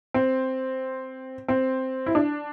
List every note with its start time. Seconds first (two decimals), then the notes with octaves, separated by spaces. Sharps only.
0.14 C4
1.48 C4
2.06 E4
2.15 D4